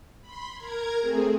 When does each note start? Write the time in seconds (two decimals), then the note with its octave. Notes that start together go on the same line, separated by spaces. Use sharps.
0.21 B5 C6
0.55 A#4 A#5 G#6
0.98 A3 C4 G#4